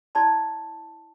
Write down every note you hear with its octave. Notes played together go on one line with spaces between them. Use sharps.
E4 D5 A5 C6